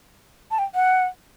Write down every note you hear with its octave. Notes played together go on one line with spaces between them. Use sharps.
A5
G5
F#5